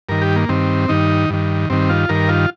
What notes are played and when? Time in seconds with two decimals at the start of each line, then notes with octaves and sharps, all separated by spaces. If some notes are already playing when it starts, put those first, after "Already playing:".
0.09 G2 D#3 A#4
0.22 G4
0.36 A#3
0.49 G2 D#3 C4
0.88 G2 D#3 D#4
1.30 G2 D#3
1.70 G2 D#3 C4
1.89 F4
2.09 G2 D#3 A#4
2.29 F4